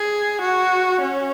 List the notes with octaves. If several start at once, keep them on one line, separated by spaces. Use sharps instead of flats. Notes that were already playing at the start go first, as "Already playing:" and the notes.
Already playing: G#4
F#4
C#4